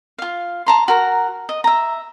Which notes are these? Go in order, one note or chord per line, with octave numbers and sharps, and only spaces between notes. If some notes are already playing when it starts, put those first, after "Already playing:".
F4 F5
A5 A#5 C6
F#4 A#4 A#5
D#5
E5 A#5